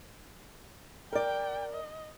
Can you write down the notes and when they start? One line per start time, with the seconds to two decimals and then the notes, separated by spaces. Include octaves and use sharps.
1.13 A#4 D5 G5
1.73 D#5